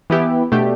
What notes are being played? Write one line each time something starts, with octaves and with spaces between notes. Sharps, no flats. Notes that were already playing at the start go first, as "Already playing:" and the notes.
E3 B3 E4 G4
B2 A3 D4 G4